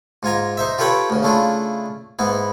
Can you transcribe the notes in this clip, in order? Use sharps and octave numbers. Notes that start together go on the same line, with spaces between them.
G#2 F4 G#5 A#5
D#4 C5 E5
F4 G4 A4 B4 C#5 G5
D2 C#3
C#3 A3 D4 E4 F4
G#2 B3 E4